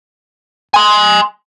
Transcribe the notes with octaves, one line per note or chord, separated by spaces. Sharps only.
G#5 C6